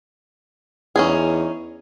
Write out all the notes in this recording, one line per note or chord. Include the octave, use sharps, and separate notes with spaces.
E2 C#4 D#4 G#4